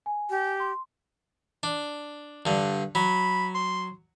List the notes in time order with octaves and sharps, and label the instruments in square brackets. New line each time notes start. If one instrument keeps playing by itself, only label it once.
[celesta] G#5
[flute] G4
[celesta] C6
[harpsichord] D4
G2 D3
[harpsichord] F#3 [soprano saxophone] B5
[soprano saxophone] C6